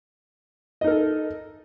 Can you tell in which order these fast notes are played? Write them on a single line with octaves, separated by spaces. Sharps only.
D#5 D#4 A#4 A4